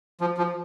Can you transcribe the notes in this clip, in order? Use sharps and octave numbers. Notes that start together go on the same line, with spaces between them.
F3
F3